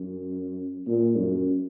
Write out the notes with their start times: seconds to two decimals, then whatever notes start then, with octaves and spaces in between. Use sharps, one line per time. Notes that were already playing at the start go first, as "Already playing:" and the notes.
Already playing: F#2
0.87 A#2
1.17 F#2